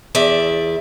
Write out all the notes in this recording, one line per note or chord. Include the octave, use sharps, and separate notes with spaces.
E2 D5 E5